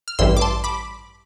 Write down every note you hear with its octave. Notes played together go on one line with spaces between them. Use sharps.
F6
A1 G2 E3 G3 C6 E6
D6
A5 C6
B5 D6